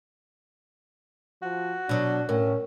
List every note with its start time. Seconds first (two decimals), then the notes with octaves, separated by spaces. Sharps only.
1.42 F3 F#4
1.89 B2 F#3 D4
2.29 A2 C#4 A#4